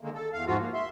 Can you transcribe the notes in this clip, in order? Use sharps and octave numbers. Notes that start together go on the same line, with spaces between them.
D3 D#3 G#3 A#3
A4
E2 F5
G#2 F3 F4 F#4
A#3
E5 C6